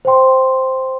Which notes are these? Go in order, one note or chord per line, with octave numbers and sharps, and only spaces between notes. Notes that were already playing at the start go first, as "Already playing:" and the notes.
C5 G5 C6